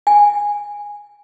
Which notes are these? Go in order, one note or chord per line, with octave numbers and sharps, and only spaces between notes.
G#5